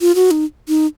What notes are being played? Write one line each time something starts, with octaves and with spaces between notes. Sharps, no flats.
F4
F#4
D#4
D#4